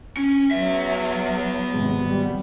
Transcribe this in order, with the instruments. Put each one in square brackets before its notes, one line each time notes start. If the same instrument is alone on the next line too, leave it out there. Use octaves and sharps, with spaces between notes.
[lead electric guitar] C#4
[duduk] F#3 [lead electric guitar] B3 E5
[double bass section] G#1 C3 G#3
G3